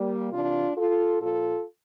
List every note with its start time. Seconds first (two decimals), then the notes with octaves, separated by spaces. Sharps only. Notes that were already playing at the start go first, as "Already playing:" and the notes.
Already playing: G3 A#3
0.32 C3 E3 D4 F4
0.77 F4 A4
1.21 A#2 F3 F4 A4